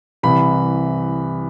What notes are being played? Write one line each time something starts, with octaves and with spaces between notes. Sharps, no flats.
C2 C3 E3 B5